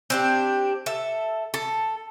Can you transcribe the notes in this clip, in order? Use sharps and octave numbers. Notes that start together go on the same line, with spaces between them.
C4 D4 G4
A4 E5
A4